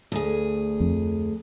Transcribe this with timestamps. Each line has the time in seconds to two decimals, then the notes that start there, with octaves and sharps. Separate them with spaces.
0.12 D2 G#4
0.80 F2